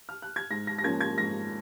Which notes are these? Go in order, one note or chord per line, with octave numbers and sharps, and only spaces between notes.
F6
F#6
G#6
G#2 A#6
A#6
A#6
F3 A#3 C#4 G#6
G#6
G#2 A#6